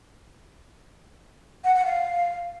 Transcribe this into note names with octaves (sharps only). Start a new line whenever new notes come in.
F#5
F#5
F5